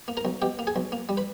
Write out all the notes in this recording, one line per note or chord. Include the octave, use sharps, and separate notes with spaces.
A#3
A#4 A#5
B1
B2 G4 G5
A#3
G#4 G#5
B1
A#3
G3
B4 B5